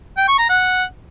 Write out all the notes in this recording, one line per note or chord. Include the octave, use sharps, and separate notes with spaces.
G5
C#6
A#5
F#5